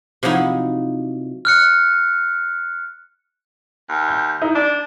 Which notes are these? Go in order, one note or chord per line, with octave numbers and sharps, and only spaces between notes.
C3 F3 F#3 D#4 E4
F6 F#6 C#7
D#2
G6
D#4 E4
D4 D5